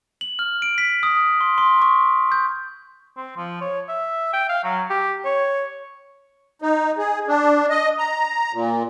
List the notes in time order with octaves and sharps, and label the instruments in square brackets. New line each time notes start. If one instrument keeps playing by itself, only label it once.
[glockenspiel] F#7
F6
D7
B6
D#6
C6
C6
C#6
G6
[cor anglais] C4
F3
C#5
E5
G5
F5
F#3
G4
C#5
[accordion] D#4
G#4
D4
D#5
A#5
A#2